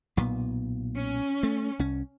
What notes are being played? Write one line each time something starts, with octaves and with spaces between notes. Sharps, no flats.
B1 A#2 B3
C#4
A3
C2 C#4